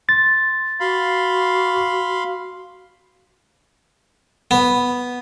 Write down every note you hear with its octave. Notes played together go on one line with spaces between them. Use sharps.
C6 A6
F#4 F5 B5 C6
B3